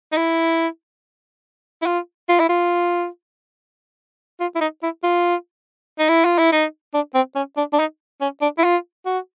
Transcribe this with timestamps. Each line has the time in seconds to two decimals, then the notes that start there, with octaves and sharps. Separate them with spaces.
0.12 D#4
0.17 E4
1.82 E4
1.86 F4
2.29 F4
2.39 E4
2.49 F4
4.40 F4
4.55 E4
4.61 D#4
4.83 E4
5.03 F4
5.99 D#4
6.09 E4
6.25 F4
6.38 E4
6.52 D#4
6.94 D4
7.14 C4
7.35 C#4
7.57 D4
7.73 D4
7.79 D#4
8.21 C#4
8.41 D4
8.58 E4
8.64 F4
9.06 F#4